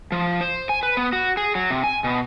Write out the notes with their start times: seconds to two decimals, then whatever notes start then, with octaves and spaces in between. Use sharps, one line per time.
0.12 F3
0.41 C5
0.69 G#5
0.83 B4
0.97 B3
1.13 F#4
1.37 G#4
1.55 F#3
1.70 C3
1.84 G#5
2.04 B2